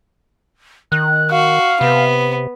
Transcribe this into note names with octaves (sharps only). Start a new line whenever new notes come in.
D#3 F#6
F#4 F5
C3 B3